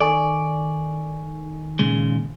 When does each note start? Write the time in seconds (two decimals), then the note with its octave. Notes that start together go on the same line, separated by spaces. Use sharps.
0.01 D#3 A4 D5 G#5 C#6
1.79 A#2 C#3 G#3